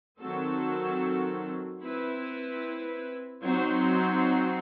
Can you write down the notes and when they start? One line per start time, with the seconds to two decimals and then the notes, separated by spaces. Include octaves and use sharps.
0.19 D#3 F#3 C4 F#4 A4
1.81 C4 E4 B4
3.43 F#3 C4 D#4 F#4 C5